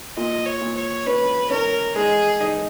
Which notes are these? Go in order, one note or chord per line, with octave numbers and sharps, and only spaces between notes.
A#2 D#5
C#5
A#2
C#5
C#4 B4
C#4 A#4
G#3 G#4
D#4